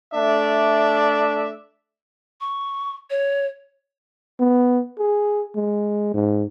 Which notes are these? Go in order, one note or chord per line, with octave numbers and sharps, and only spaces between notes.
A3 D4 D5 E5
C#6
C#5
B3
G#4
G#3
G#2